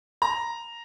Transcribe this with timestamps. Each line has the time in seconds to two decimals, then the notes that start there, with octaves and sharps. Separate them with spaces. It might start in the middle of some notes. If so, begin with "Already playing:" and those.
0.22 A#5